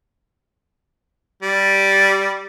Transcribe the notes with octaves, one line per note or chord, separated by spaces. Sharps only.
G3